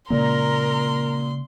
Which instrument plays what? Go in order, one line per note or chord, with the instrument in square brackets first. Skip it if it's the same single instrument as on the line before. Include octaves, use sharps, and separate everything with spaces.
[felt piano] A#2 [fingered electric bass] C#3 G#3 A#3 [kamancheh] A#4 A#5 [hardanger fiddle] C6